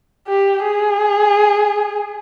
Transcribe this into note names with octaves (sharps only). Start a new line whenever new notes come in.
G4
G#4